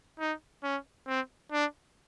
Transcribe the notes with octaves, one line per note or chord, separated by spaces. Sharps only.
D#4
C#4
C4
D4